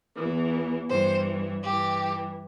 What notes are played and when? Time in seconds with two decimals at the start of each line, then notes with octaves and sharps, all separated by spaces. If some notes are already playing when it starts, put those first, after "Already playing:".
0.15 E2 E3
0.89 G2 E3 C5
1.63 G2 E3 G4